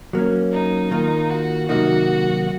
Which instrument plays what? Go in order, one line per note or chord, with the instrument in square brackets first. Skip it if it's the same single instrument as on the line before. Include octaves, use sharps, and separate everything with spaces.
[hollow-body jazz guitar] F#3 A#3 C#4
[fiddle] D#4
[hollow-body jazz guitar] D#3 A#3 F4
[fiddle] F#4
[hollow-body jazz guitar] C3 D#3 F#3 A#3 D#4 [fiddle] F#4